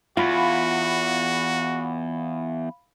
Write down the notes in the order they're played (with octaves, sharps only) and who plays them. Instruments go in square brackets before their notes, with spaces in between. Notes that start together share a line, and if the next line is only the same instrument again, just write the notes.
[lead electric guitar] E2 [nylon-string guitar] F4 [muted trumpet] F#4 [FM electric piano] F5 B5